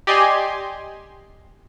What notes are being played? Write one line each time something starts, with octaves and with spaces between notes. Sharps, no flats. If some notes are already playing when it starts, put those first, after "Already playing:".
G4 D5 D#5 G#5 C6